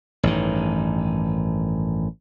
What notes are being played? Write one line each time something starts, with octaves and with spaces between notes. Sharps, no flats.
A1 G2 D#3